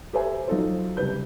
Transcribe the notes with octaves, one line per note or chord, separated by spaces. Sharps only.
G4 A4 B4 C5 E5 G#5
F#3 D#4 F4 A4 C5
F#1 C2 G4 B4 G6